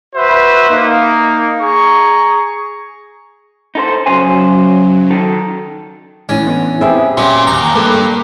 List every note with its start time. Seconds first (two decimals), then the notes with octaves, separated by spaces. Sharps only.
0.15 F#4 B4 C5 E5
0.70 A#3 D#4
1.61 G#4 A#5 C#6
3.75 D#4 A4 C5
4.06 C#3 F#3 C5 G#5
5.10 D#3 A4
6.29 A2 E3 C#4 D4 G#5
6.47 B3
6.81 C4 G4 G#4 B4 E5
7.17 A#2 C#4 F#4 G4
7.47 D#2 A#5
7.75 G2 A#3 A4 B4